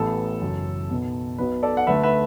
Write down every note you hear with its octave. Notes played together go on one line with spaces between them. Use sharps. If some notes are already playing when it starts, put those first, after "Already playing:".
Already playing: A1 A2 E3 B3 A4
F#1 F#2 E3
B1 B2 B3
B1 B2 B3 B4
A4 D5
F#5
D2 D3 A3 B4 E5
B4 E5